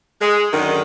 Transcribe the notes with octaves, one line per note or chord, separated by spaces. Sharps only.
G#3
F#2 D3 D#3